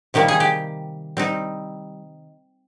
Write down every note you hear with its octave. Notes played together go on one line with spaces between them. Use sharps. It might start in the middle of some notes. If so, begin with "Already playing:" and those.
C3 D#3 G3 A#3 G4
G#4
G4
G3 C4 D#4